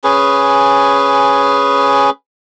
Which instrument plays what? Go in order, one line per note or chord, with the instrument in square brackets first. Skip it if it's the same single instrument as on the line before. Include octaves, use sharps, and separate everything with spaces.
[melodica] C#4 G#4 B4